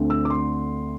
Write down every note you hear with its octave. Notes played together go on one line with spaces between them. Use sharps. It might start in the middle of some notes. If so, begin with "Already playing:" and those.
Already playing: D2 D3 A3 C4
E6
D6
C6